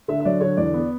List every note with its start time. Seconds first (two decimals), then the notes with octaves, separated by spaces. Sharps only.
0.08 D3 E5
0.20 E5
0.25 F#3 D5
0.41 D3 C#5
0.57 E2 D5
0.74 B3